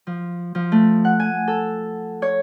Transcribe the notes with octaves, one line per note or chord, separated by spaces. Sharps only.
F3
F3
A3
F#5
G#5
A4
C#5